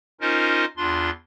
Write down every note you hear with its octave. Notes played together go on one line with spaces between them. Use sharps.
C#4 D#4 F4 A#4 C5 D#5
E2 D4 F4 C6